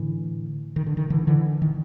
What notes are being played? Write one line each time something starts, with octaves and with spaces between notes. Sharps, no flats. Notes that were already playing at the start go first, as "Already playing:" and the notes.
Already playing: A2 D3 E3
D#3
D3
D#3
D3 E3
D3 E3
D#3